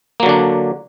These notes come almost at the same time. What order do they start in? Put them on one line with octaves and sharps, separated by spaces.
A#3 F#3 D3 D4